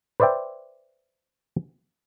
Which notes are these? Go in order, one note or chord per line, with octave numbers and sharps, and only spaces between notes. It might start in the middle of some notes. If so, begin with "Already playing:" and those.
B4 C5 D5 E5 G5